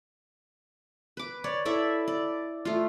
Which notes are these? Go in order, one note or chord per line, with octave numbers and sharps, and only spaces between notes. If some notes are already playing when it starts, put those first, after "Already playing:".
B4 D6
C#5 D5
E4 A4 D5 E5
D5
A3 F4